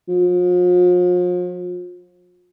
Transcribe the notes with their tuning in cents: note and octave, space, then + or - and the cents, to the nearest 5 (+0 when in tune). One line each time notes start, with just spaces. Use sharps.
F3 +40